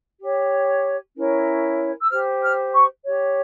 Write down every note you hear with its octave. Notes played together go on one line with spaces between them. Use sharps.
G4 C#5
C#4 E4 A#4 C#5
E6
G4 C5 F6
F6
C#6
G4 C#5